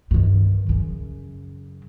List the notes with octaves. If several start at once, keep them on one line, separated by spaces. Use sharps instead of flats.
G2 D#3
F#2 C#3